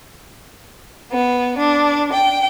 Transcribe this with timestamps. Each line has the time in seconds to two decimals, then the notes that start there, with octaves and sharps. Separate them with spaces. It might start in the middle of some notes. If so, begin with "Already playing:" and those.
1.12 B3
1.57 D4
2.13 G5